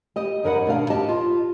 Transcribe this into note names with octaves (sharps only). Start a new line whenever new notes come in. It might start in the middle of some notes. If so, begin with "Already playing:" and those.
G4 D#5
F#2 E3 A#4 B4 D#5 F#5
D#2 B2 D4 F5
G4 D#5 A5
F4